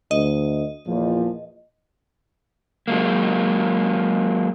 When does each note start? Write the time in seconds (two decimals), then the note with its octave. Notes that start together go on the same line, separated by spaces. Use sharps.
0.11 D2 D#5
0.87 E2 A#2 F3
2.88 F#3 G#3 A#3